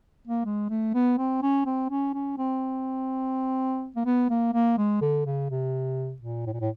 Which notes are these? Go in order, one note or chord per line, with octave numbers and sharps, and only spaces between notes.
A#3
G#3
A3
B3
C4
C#4
C4
C#4
C#4
C4
A#3
B3
A#3
A#3
G#3
D3
C#3
C3
A#2
A2
A#2
A2